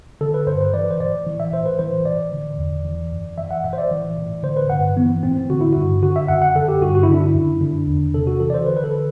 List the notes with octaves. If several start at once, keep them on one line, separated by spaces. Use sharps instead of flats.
D3 A4
B4
G2 C5
B4
E3 D5
C5
A2 D5
E3
E5
A2 C5
B4
E3 C5
A2 D5
D3
E2
E3
F#2
E3 E5
F#5
A2 E5
C5
D5
E3
A2
D3 C5
B4
G2 F#5
E3 B3
A2 C4
D3 F#4
E4
G2 F#4
D3 F#4
E5
F#2 F#5
F#5
D3 A4
G4
G2 F#4
F#4
E4
D3 D4
E4
F#2
D3 D4
E2
C3 A4
F#4
E3 A4
D5
C5
D3 B4
B4
A4